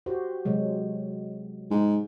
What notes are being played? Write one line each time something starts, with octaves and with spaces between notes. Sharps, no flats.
F#4 G4 C5
C3 F#3 G#3
G#2